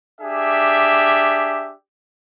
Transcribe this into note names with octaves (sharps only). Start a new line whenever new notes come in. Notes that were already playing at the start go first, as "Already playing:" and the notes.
D4 G4 G#4 E5